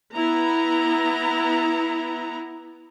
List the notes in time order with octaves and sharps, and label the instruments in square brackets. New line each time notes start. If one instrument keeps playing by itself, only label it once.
[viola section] B3 E4 A#5